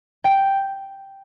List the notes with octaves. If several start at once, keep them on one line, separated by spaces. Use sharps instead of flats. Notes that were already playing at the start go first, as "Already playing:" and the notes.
G5